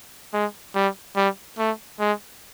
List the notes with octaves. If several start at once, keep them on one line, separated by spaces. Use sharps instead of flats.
G#3
G3
G3
A3
G#3